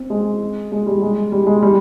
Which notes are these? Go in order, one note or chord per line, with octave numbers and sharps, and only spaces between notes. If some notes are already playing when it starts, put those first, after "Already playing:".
Already playing: C4
G#3
G#3
G3
G#3
G3
G#3
G3